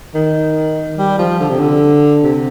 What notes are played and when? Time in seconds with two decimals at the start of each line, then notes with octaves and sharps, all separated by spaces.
0.14 D#3
0.98 G3
1.18 F3
1.40 D3
1.49 C3
1.59 D3
2.24 C3